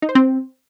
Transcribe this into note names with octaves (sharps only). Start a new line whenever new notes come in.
D#4
C5
C4